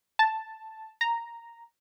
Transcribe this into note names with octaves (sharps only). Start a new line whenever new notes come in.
A5
A#5